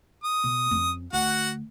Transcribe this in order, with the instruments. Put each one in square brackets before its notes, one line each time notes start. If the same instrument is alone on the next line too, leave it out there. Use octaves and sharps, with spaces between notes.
[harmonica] D#6
[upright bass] B2
F2 C#4
[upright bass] D2 [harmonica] F#4 F#5